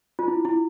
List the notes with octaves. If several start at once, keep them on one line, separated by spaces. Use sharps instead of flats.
F4
E4
E4